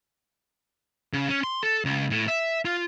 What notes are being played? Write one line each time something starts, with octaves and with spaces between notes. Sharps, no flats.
C#3
C#4
C6
A4
C#2
A2
E5
F4